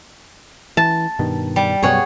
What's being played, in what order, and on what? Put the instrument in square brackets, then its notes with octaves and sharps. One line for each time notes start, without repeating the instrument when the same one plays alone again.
[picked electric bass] E3 [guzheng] A5
[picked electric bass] G2 B2 D#3
[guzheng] G3
[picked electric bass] F#2 B2 G3 [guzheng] G#4 C#5 F#5